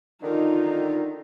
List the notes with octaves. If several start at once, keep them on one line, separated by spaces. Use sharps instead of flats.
D3 D#3 D#4 F4